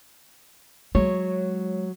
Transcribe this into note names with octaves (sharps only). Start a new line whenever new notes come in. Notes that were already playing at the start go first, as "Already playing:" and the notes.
F#3 G#3 C#5